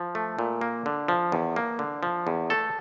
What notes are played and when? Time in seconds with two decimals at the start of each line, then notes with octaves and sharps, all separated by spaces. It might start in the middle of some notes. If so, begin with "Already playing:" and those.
Already playing: F3
0.15 A3
0.39 A#2
0.61 A#3
0.86 D3
1.08 F3
1.32 E2
1.56 A#3
1.79 D3
2.03 F3
2.27 E2
2.50 A3 A4